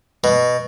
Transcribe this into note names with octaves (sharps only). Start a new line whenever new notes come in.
B2